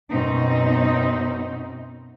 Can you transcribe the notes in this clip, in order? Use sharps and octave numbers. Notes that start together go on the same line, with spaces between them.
F#2 B2 F#3 C4 D#4